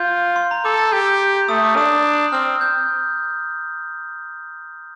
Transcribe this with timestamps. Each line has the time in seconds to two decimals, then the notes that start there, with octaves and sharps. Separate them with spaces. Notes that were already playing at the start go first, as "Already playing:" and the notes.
Already playing: F4 G6
0.36 C6
0.51 A#5
0.65 A4 D6
0.79 A6
0.92 G4 G6
1.48 A3 D#6
1.63 D6
1.77 D4 D#6
2.32 C4 F6
2.61 G6